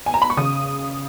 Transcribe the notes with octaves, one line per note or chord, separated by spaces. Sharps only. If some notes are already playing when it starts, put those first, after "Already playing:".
G#5
A#5
B5
C#6
C#3 D#6